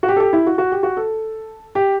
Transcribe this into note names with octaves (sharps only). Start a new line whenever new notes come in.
F#4
G4
A4
G4
E4
F#4
F#4
G4
F#4
A4
G4